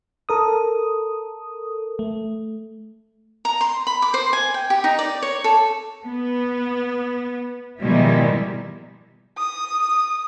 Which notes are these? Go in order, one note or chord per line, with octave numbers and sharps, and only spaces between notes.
A4 A#4 D#6
A3
A#5
C6
B5
D6
C5
G#5
G5
G4
D#4
D5
C#5
A4
B3
B2 D#3 F3 G3 G#3 E4
D#6